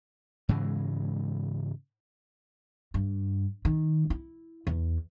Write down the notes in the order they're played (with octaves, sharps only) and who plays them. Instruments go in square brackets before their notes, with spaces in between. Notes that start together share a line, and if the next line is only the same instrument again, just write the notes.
[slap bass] G#2 C#3 E3 G#3
[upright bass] G2
D#3
E4
E2